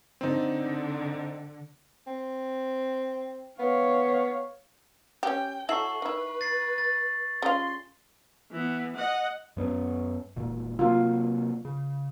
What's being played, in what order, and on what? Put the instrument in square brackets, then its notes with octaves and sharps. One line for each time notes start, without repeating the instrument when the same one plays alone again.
[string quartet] D3 [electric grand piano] C4 D#4
[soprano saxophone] C4
[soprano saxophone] B3 [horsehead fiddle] C#5 F5
[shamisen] C#4 G4 [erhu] G5
[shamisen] F#3 E4 E5 [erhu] A4 [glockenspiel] C#6 C7 F#7
[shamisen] D#3 E4 [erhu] B4
[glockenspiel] A6 C7
A6
[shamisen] C#3 G3 F4 [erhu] C6
[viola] E3 B3
D#5 F#5
[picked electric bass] F#2 B3 C#4
E1 A#2
[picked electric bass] C3 F#3 A#3 [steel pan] F4
[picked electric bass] C#3